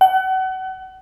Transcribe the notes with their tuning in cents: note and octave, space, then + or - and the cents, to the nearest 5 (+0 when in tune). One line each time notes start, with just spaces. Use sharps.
F#5 +35